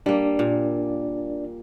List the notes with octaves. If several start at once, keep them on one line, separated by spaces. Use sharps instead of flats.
G3 A#3 D4 D5
A#2